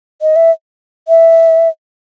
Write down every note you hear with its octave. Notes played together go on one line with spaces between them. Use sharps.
D#5
E5
E5